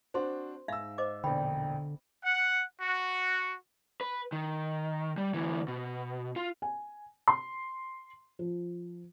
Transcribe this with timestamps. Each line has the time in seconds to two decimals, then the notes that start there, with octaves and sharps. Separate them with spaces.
0.14 C4 D4 F#4 C5 C6
0.68 G#2 D#4 E5 F5 E6
0.98 C5 D#5 D6
1.24 E1 A#1 D3 G5 B5
2.24 F#5
2.81 F#4
4.01 B4
4.32 D#3
5.18 G3
5.34 D2 E3
5.68 B2
6.36 F4
6.62 G#5
7.28 C6
8.39 F3